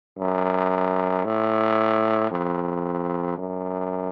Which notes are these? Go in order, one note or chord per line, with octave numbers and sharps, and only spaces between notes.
F#2
A2
F2
F#2